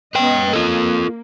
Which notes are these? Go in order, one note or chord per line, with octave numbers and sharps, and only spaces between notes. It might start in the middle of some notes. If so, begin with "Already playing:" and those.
B3 C#4 B4 D#5 G5
A#3 F4 A4